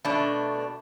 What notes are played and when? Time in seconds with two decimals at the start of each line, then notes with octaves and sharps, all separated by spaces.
0.05 B2 A3 D4